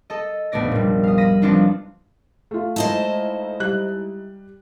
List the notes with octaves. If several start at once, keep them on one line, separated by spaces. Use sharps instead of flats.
A4 D#5
F1 A#1 A3 B3 D5 A#6
A#2 G3
F5 D#6
B5 A#6 D#7
F3 B3 C4 D4 D#4 F4
A3 F4
G#3 D#4 E4 C5 D#5 A5
G3 F#6